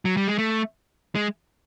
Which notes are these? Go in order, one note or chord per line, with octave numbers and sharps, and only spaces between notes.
F#3
G3
G#3
A3
G#3